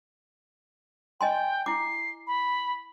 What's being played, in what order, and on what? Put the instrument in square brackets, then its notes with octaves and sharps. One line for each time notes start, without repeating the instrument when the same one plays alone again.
[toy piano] D#5 G#5 C6 [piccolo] G5
[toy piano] E4 D6 [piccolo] C7
[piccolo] B5